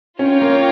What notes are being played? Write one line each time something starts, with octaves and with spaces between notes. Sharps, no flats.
C#4 F4 A#4 C#5 G5
A#3